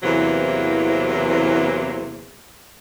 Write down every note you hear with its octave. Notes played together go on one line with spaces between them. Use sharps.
E2 C3 E3 F#3 A#3 C4